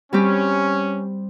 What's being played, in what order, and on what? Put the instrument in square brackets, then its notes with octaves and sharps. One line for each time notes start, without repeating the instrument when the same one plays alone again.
[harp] G3 C4 G4 [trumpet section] C#4